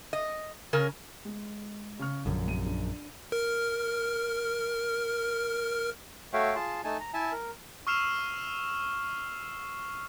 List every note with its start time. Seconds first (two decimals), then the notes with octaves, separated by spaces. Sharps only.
0.13 D#5
0.73 C#3 C#4 A#4
1.25 G#3
1.99 C#3 C#6 F6
2.26 A#1 F#2 D3
2.46 C2 D#7
2.66 D4
3.32 A#4 F6
6.33 A3 F#4 C#5 E5 F5 G5
6.55 F4 G#4 A5 C6
6.84 A3 D#4 G#5 A5
7.00 A#5
7.14 E4 E5 G#5 A5
7.32 A#4
7.87 C#6 E6 F6 C7 E7 F7